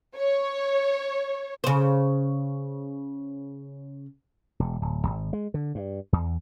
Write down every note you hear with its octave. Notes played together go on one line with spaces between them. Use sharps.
C#5
C#3 C5
E1
D1
G#1
G#3
D3
G2
E2